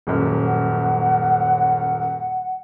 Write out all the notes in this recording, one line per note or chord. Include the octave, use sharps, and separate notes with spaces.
D#1 F#2
F#5